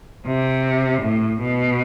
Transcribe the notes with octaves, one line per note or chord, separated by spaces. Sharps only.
C3
A2
B2